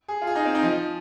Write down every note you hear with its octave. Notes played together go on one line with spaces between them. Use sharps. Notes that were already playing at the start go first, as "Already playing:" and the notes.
G#4
F4
G#4
D#4
C4
D#4
F3